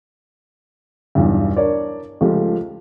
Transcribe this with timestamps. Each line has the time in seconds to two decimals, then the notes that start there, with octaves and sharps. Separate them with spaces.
1.15 B1 E2 G2
1.56 D4 A#4 C#5 D5
2.21 C#2 F3 A3 G4